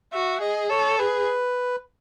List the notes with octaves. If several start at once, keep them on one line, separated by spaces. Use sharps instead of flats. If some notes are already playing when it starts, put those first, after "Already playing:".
F#4 E5
G#4 D#5
A4 C#5
G#4 B4